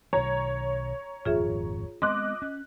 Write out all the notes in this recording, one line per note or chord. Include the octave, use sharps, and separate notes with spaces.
B1 D#3 C#5 A#5
D#1 G#1 F2 F4 G#4 E5
G#3 B3 C4 D#5 C6 D6 F#6
C#4